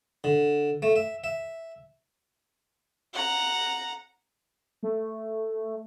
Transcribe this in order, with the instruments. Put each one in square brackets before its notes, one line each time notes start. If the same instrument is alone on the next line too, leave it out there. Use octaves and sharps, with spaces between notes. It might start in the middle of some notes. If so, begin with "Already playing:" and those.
[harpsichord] D3
A3
E5
E5
[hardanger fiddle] F#5 A#5
[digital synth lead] A3